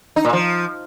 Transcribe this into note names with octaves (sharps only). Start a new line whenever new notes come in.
D#4
A#2
F3